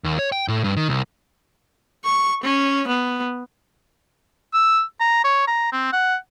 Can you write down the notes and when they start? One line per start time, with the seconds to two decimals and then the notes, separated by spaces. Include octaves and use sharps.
0.04 D#2
0.19 C#5
0.32 G5
0.48 A2
0.64 G2
0.77 D#3
0.89 C2
2.04 C#6
2.44 C#4
2.88 B3
4.53 E6
5.00 A#5
5.24 C#5
5.47 A#5
5.72 C4
5.93 F#5